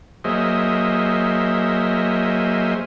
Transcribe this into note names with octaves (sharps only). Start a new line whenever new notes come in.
F#3 A#3 G#4 C5 D#5 E5